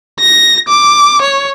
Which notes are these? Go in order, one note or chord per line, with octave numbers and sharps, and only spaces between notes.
A#6
D6
C#5